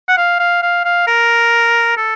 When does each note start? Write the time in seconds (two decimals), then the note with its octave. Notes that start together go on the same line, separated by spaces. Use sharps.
0.08 F#5
0.17 F5
0.39 F5
0.62 F5
0.85 F5
1.07 A#4
1.97 A4